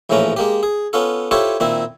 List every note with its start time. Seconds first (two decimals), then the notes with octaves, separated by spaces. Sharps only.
0.10 A#1 A2 E3 F3 C#4 A#5
0.37 G#3 A#3 G4
0.63 G#4
0.93 B3 C#4 F4 A4
1.31 E4 F4 G4 A4 C5 C#5
1.60 A#2 D#3 C4 E4